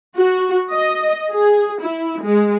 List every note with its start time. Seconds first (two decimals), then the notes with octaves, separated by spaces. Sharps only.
0.16 F#4
0.71 D#5
1.30 G#4
1.81 E4
2.22 G#3